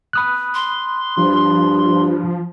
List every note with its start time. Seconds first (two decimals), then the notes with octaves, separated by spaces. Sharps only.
0.13 B5 D#6 F#6
0.54 C6
1.17 G2 F3